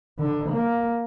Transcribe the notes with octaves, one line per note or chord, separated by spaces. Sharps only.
D3
A#3